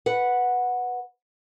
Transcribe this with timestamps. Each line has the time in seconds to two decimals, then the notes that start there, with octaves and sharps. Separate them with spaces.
0.06 B4 F#5